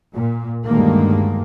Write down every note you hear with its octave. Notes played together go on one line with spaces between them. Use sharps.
A#2
D2 G2 D#3 G#3 A#3